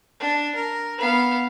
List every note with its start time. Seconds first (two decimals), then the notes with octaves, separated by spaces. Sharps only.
0.20 D4
0.55 A#4
0.98 B3 F5